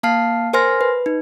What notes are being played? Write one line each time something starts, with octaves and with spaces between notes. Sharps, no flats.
A#3 F5 A5 F6 C7
A#4 C5 G#5 C6 F6 A#6
B4
D#4